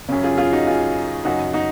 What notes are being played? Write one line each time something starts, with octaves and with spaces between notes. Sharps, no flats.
F#2 C#3 C#4
F4 G#4
F4 G#4
D#4 F#4
F4 G#4
F#2 C#3 D#4 F#4
D#4 F#4